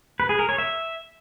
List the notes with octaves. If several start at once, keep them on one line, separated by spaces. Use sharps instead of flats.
B4
G#4
A#4
C#5
E5